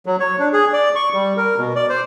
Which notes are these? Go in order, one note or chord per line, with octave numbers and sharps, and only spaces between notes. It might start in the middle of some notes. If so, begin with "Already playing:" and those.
F#3
C#5
D4
G#4
D5
C#6
G3
A#4
B2
D5
C5